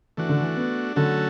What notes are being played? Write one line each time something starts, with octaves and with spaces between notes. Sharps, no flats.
E3 A3 D4 F#4
D3
E3
B3
D3 F#3 A3 C#4 F#4 A4